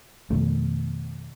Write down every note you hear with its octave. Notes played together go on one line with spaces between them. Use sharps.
F2 B2 D#3 A3